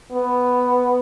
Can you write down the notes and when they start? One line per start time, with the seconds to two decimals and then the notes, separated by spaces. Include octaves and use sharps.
0.12 B3